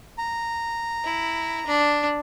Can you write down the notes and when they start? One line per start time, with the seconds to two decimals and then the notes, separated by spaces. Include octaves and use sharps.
0.18 A#5
1.05 E4
1.67 D4